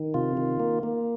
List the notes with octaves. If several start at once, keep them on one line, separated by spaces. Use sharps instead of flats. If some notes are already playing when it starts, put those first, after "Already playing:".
Already playing: D#3
C3 F4
D#3
A#3
A#3